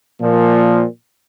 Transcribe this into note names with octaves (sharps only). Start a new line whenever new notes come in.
A#2 F3